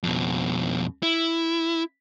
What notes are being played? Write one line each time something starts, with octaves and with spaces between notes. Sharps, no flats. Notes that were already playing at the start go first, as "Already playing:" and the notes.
F2 B2
E4